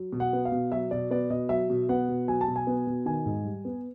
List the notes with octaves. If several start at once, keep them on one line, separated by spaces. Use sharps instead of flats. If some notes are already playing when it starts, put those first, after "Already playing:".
Already playing: F#3
B2
F#5
B3
F5
B2
F#3 E5
B2 D5
B3 D5
B2 D#5
F#3 E5
B2
B3 F#5
B2
F#3 G#5
A5
B2
G#5
B3
B2
D#3 G#5
G#2
G3
B3